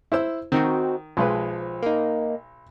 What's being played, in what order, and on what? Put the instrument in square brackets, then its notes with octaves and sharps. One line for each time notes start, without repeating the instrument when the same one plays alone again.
[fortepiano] E4 C5 E6
[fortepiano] D#3 [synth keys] C4 D#4 F#4
[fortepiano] B1 G#3 B4 [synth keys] F3
[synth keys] A#3 D#4